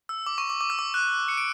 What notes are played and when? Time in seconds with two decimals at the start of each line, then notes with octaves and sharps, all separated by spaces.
0.09 E6
0.26 D6
0.38 C#6
0.50 D6
0.61 D6
0.70 E6
0.79 D6
0.94 F#6
1.28 C#7
1.37 D7